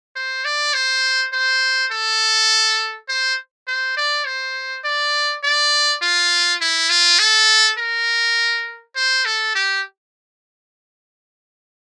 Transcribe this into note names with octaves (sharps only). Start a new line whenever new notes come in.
C5
D5
C5
C5
A4
C5
C5
D5
C5
D5
D5
F4
E4
F4
A4
A#4
C5
A4
G4